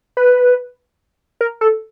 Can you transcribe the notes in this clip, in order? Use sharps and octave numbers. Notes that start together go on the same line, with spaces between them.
B4
A#4
A4